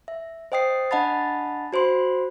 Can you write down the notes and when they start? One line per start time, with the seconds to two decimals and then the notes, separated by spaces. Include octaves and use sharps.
0.08 E5
0.52 C5 D#5 G5 D#6 C7
0.91 D4 D#5 F#5 A5 B5 A6
1.73 F#4 C5 B5 C6